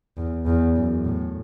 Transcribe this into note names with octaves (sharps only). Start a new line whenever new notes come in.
E2
E2
F#2
A2